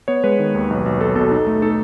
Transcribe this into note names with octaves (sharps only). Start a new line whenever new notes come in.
B3 C#5
G#3 B4
D#3
D#2
B1
B1
B1 A4
B2 A4
D#4
A3
D#4 A4